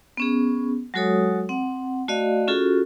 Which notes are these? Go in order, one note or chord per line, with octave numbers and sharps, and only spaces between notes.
B3 C#4 G#4
F#3 G#3 F#4 A4 C#5 D#6
C4 F#5
A3 F#4 D5 D#5 F5
C#4 F4 F#4 G#4 A4